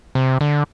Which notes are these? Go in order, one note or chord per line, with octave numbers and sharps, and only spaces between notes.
C3
D3